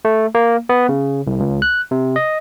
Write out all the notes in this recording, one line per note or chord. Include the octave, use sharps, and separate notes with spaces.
A3
A#3
B3
C#3
C2
C#2
F#6
C3
D#5